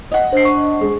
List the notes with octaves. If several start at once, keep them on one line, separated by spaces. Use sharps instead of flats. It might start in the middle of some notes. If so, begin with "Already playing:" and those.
D#5 F#5
D4 C5 C7
C#6
G#3